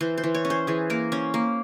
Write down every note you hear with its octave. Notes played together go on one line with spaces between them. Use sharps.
E3 C5
C5
E3
C#5
C#4
C5
E3 G#4
A#3 A#4
C#4 C5
A#3